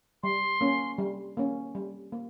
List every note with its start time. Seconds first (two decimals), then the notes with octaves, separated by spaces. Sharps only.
0.23 G3 C6
0.61 A#3 C#4
0.98 G3
1.37 A#3 C#4
1.75 G3
2.12 A#3